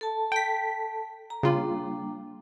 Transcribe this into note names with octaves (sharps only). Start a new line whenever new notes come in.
A4 A5
G5 B6
A#5
C#3 G3 A#3 D4 F4